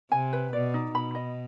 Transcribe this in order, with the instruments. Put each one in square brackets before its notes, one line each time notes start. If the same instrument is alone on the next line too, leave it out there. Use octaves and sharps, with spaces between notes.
[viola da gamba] C3 [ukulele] G#5
[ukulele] B4
[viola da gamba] B2 [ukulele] D5
[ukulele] D#4
[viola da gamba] B2 [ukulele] B5
[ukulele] D#5